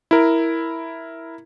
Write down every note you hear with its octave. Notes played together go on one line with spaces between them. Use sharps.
E4 A#4